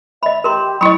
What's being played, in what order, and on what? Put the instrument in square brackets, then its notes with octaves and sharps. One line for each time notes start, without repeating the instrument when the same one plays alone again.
[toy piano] D#5 B5 [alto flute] E5
[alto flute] G4 [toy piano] A#4 A#5 C6
[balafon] F#3 E4 [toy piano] D#5 B5 [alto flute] C#6